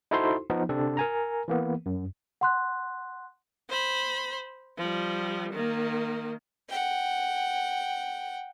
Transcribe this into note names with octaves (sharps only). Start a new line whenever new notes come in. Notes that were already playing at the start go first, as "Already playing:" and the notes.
D#4 E4 F#4 A4 C5 C6
F3 B3 D#4
C3 C4 D4 A4
A#4 G#5 A#5
E3 A#3 B3
F#2
F#5 C6 F#6
C5 B5
F3 G3
D#3 A#3
F#5 G5